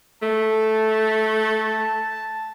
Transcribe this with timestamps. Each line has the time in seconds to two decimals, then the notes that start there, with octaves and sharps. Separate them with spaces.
0.22 A3 A5